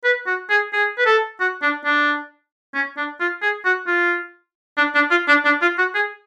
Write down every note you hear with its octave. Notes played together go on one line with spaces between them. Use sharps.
B4
F#4
G#4
G#4
B4
A4
F#4
D4
D4
C#4
D4
F4
G#4
F#4
F4
D4
D4
F4
D4
D4
F4
F#4
G#4